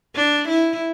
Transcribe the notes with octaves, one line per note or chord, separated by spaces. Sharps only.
D4
E4